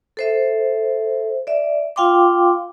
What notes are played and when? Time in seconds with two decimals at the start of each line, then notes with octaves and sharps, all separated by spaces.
0.17 A4 C5 E5
1.47 D5 E5
1.96 F4 F5 G5 C6 D6